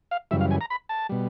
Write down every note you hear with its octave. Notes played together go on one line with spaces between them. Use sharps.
F5
F#2 C#3 E3 G3 E5
F5
G#5
A#5
B5
A5
B2 G3